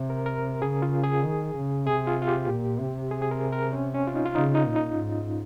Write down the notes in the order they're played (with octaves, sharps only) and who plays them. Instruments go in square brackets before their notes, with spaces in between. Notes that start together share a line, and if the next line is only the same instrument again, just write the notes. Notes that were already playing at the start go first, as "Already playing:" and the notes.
Already playing: [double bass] C3
[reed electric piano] A#4
A#4
[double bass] C#3 [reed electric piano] G#4
[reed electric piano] F4
G#4
[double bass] D#3
C#3
[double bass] C3 [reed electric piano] G#4
[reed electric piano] F4
F4
G4
[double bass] A#2
C3
[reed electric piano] G#4
G#4
A#4
A#4
C#4
C#4
F4
D#4
F4
[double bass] C#3 [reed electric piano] D#4
[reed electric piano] D#4
[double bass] A#2
[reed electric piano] D#4
[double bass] G#2